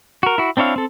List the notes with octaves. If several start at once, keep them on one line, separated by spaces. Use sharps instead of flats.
F#4 A#4
E4 F#4
C4 D4 E4 C#5 F5
C4 A4